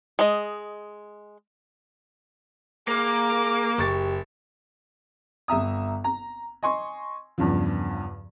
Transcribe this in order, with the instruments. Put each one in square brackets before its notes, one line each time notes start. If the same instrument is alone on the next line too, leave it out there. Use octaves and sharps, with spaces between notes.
[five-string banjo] G#3 D#5
[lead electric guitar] A#3 [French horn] G#4 [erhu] D6
[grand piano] F#1 C#6 A6 [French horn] G4
[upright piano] G1 E5 A#5 D#6
A#5
D#5 G#5 C6 C#6
E2 G2 C#3 F3